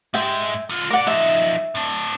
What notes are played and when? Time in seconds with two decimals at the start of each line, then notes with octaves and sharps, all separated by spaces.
0.14 G#2 G#3 E5 G5
0.70 D3 F4
0.90 A#4 D5 F#5 D6
1.07 F3 D#4 E5
1.75 A2 D4